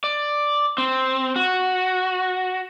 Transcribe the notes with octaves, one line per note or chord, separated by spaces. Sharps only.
D5
C4
F#4